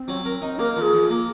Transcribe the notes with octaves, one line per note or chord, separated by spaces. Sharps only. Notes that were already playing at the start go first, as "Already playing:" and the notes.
Already playing: C4
F#3
A#4
D#4
A#3 A#4
F3 G#4
F3
A#3